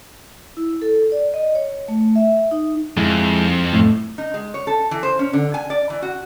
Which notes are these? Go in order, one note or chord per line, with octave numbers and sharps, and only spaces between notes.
E4
A4
D5
D#5
C#5
A3
E5
D#4
F2 G#3 E4
A2 A3
D#4
G#3
C#5
A4
E3
C5
C#4
D3
G#5
D5
E3
F#4